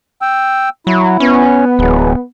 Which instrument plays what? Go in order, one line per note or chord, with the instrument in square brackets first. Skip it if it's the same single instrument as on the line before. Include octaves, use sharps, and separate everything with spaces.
[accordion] G5 E6
[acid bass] F#3 [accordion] E4
[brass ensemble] B3 [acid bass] C#4
[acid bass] D1 [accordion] E3 F#3 G#3